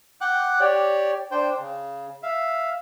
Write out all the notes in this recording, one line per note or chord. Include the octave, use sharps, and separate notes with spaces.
F#5 G5 D6 F#6
G4 C#5 D5
D4 C5 G5
C#3
E5 F5